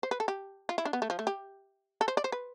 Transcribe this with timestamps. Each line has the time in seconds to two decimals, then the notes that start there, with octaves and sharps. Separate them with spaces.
0.03 C5
0.11 B4
0.20 A4
0.28 G4
0.69 F4
0.78 E4
0.85 D4
0.93 B3
1.02 A3
1.10 F3
1.19 A3
1.27 G4
2.01 A4
2.08 C5
2.17 D5
2.24 C5
2.32 B4